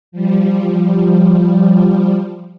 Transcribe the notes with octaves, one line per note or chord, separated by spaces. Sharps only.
F3 G3